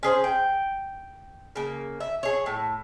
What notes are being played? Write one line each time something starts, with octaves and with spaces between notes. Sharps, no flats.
C#4 G#4 C5
G5
C#3 A#3
E5
G#4 C#5
A2